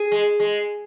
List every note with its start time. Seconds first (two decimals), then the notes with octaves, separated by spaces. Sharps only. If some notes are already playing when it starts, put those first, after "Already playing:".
Already playing: G#4
0.12 G#3
0.40 G#3